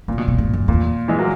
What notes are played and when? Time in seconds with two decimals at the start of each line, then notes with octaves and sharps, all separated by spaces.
0.08 A#2 C#3
0.18 B2
0.28 B2
0.38 G#2
0.53 F#2
0.68 E2 A#2
1.08 E3 G#3
1.19 F#3 A#3